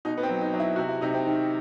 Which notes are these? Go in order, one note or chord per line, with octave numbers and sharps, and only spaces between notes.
B2 D#4
B3
C4
F#3
D#4
F#3
E4
C3 F#4
E4
C3 D#4
C4
D#3